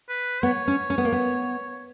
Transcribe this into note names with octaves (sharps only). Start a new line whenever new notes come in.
B4
B3 C#5
C#4
C#4
B3
A#3
B3